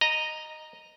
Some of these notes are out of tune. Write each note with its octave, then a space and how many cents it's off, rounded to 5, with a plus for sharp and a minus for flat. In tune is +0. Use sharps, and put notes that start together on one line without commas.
D#5 -10 A#5 +0